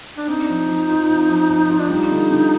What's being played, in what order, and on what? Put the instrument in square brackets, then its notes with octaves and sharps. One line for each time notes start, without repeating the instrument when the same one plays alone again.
[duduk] D4
[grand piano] C4 [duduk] D#4
[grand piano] F3
F3
F4
C4
F3
F3
F4
[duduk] D4
[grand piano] G3 [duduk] D#4
[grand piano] D3
D3